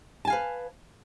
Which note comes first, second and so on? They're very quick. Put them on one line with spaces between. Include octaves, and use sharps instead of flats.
A5 G#5 F5 B4